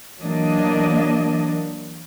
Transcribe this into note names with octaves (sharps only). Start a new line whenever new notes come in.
E3 F#3 A#3 D4 D#5